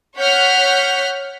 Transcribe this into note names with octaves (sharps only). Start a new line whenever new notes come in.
C#5 F#5 F6 G6 B6